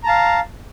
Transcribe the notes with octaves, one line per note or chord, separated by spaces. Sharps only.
F5 A5 A#5